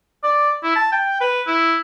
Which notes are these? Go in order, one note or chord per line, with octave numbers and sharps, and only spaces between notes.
D5
E4
A5
G5
B4
E4